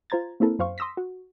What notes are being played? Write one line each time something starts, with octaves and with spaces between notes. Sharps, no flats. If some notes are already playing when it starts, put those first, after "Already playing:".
F4 C5 A#5 G#6 A6
A#3 C4 E4 A4 A#4
F#2 C5 F5 C#6
C6 D#6 E6 A#6 B6
F#4